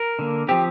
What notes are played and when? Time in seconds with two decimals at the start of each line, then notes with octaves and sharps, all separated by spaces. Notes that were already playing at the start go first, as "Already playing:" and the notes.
Already playing: A#4
0.19 D3 A#3
0.48 F3 C4 G4